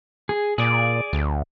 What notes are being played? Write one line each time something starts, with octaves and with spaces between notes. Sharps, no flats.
G#4
A#2 G#4 D5
D2